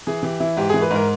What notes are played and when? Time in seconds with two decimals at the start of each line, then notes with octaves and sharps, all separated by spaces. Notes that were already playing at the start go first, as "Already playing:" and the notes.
0.07 E3 G#4
0.23 E3 G4
0.40 E3 E4
0.57 G#2 G4
0.69 E3 G#4
0.82 B4
0.90 G#2 A#4